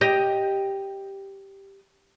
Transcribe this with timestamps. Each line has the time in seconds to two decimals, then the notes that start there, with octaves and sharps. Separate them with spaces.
0.01 G4 D#5